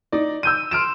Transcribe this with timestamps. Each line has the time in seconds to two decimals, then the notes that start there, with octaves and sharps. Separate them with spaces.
0.12 D#4 D5
0.43 E6 G6 D#7
0.71 C6 F6 D7 E7